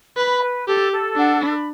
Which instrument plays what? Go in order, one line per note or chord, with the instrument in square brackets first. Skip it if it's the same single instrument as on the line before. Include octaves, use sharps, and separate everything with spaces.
[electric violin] B4 [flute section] B5
[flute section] B4
[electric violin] G4 [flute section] A4
[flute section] A4
[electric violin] D4 [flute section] F#5
[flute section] B5